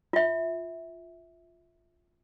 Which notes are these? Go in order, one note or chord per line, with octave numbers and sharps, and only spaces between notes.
F4 E5